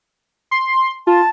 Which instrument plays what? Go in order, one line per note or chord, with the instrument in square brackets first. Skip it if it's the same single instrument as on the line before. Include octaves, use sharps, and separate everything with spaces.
[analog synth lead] C6
[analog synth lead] F4 [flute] A5